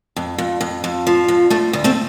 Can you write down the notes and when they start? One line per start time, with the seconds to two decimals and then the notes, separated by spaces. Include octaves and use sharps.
0.16 F2
0.38 F2
0.61 F2
0.84 F2
1.07 F3
1.28 F2
1.50 D2 A3
1.73 D2
1.84 A3 C4